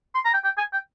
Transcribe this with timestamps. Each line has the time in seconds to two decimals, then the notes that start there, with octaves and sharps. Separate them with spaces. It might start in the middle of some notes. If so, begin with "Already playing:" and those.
0.15 C6
0.25 A#5
0.34 G5
0.44 G5
0.58 G#5
0.73 G5